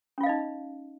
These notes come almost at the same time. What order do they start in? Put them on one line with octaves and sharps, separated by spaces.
C#4 F4 F5 D#5 D#4